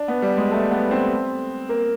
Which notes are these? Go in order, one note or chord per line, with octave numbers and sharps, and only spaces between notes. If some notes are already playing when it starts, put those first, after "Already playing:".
Already playing: D4
B3
G3
G#3
A3
B3
C4
A#3